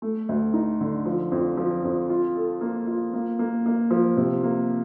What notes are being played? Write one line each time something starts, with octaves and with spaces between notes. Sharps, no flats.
A3
D2
D#4
D3
F3
F2
F3
F2
F4
A4
A#3
F4
A#3
A#3
A#3
F3
C3
A#3